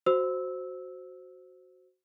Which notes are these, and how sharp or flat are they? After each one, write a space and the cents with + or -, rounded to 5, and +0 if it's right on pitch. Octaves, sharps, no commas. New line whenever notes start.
F#4 +0 C5 +0 E6 -15